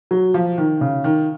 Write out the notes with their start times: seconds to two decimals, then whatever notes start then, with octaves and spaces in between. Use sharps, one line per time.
0.11 F#3
0.34 F3
0.58 D#3
0.81 C#3
1.04 D#3